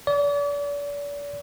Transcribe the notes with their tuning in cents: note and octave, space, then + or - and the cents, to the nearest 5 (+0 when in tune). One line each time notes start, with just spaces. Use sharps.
D5 -40